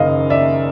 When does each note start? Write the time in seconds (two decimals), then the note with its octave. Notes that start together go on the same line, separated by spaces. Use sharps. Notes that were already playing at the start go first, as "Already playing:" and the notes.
Already playing: F#1 F#2 D#3 D#5 F5
0.30 D5 E5